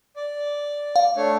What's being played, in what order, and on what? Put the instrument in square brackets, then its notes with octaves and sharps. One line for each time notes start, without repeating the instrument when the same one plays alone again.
[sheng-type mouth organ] D5
[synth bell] F5
[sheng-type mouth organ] A3 D4 C#5